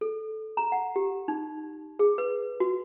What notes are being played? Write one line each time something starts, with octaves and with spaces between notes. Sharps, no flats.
A4
A#5
F#5
G4
D#4
G#4
B4
F#4